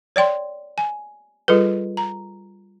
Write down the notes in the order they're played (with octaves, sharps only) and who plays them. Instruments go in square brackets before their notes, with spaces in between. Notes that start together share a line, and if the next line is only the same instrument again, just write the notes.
[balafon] C#5 D5 G5 C6
G#5
G3 F4 G#4 A4 B4
A#5